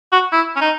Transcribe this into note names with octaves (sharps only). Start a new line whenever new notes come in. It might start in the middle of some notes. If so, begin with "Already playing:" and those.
F#4
E4
C#4
D#4